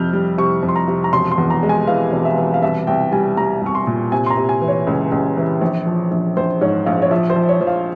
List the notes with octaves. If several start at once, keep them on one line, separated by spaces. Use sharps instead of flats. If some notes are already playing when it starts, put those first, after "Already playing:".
Already playing: F2 C3 F6 G6
G3
C3 C#6
F2
C6
A#5
C3
A#5
E1 C6
C6
E2
A#5
G#3
G#5
E3 F5
E1
E5
E3
F5
C2 E5
C2 G5
G3 G#5
G3 A#5
C2 C#6
C6
A#2
C3 G#5
C6
A#5
C3
G#5
E3
C#5
C#2
C#2
E3
A#1
F3
A#1
A#1 C5
G#2 C#5
A#1 F5
C#5
F3 E5
C5
F3
C#5
F3
F5